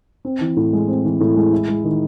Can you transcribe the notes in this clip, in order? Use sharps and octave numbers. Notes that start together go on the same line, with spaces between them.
C4
E3
A2
G#3
C4
E3
A2
G#3
E4
G#3
D#3